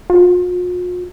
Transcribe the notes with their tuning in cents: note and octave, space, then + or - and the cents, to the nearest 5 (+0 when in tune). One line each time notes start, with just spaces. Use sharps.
F4 +45